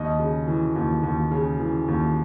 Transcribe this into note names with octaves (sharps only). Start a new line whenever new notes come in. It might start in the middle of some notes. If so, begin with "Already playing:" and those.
Already playing: D#2 D#5
C#3
E3
D#2
D#2
C#3
E3
D#2